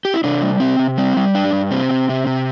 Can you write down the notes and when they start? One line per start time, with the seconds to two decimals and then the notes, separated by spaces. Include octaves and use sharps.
0.05 G4
0.14 E4
0.24 C3 D4
0.42 G3
0.60 C3 C4
0.79 C3
0.98 G3 C4
1.17 G3
1.35 G2 D4
1.53 G2
1.71 C3 C4
1.91 C3
2.09 C3
2.27 C3